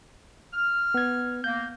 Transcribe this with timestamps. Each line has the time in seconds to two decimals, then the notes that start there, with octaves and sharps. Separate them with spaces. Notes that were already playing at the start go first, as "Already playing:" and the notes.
0.53 F6
0.94 B3 G#6
1.44 A#3 G6